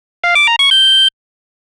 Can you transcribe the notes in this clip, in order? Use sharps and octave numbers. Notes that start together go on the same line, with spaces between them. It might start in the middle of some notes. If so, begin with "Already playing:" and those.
F5
D6
A#5
C#6
G6